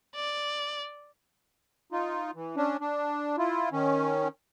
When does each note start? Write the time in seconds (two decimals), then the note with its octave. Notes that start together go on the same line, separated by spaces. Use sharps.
0.15 D5
1.92 D#4 F4
2.35 E3
2.56 C#4 D4
2.81 D4
3.38 E4 F4
3.72 D#3 C#4